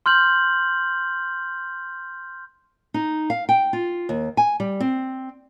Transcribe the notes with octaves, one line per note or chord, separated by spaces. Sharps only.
C6 F6 G6 F#7
D#4
F5
G5
F4
D#2
G#5
G3
C4